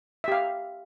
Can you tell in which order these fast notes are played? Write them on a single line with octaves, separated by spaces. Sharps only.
E5 G4 F5